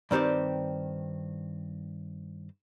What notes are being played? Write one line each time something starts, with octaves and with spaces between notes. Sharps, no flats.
G2 D#3 C4 G4 D5